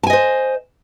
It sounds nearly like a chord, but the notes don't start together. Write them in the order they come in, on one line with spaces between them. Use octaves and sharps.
A5 G#5 D#5 C5